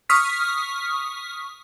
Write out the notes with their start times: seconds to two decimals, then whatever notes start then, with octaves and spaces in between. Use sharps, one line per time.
0.09 C#6 D#6 F6 B6